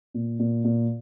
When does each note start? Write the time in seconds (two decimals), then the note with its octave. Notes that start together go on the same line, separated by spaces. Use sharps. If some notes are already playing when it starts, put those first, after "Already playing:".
0.14 A#2
0.39 A#2
0.64 A#2